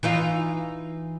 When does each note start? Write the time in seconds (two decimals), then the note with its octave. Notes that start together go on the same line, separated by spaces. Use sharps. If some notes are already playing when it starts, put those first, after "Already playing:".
0.03 E3 D#4 F4